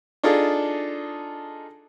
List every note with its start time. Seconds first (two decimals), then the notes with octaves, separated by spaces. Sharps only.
0.23 D4 D#4 F4 G#4 A4